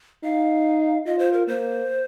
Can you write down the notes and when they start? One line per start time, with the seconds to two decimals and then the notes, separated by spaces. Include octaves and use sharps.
0.24 D#4 F5
1.06 F4 D#5
1.19 C5
1.33 A#4
1.48 A#3 C5